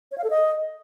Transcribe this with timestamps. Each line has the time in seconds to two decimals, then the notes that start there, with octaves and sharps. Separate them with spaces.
0.12 C#5
0.18 F5
0.24 A4
0.30 D#5